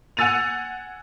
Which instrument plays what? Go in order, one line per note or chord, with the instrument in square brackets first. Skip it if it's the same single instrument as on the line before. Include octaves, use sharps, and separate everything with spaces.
[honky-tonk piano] F#5 G#5 E6 A6 D#7 F7